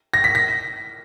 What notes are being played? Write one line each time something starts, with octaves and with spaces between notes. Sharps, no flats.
A#6
B6
A#6